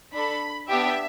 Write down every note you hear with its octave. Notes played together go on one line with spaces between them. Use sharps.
D4 A4 B5
B3 D4 G4 E5